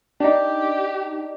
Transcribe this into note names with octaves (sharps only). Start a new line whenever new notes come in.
D4 D#4 G4